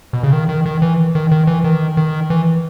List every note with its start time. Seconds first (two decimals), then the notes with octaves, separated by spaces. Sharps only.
0.13 B2
0.23 C#3
0.33 D#3
0.49 D#3
0.66 D#3
0.82 E3
1.15 D#3
1.31 D#3
1.47 E3
1.64 D#3
1.97 D#3
2.30 E3